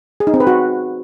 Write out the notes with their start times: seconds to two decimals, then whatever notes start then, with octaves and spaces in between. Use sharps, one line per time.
0.20 G#4
0.27 D#4
0.34 C4
0.40 B4
0.47 F#4